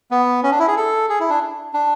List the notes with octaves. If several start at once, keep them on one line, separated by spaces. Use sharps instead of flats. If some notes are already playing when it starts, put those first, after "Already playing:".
B3
C#4
D4
E4
G#4
A4
G#4
E4
D4
D4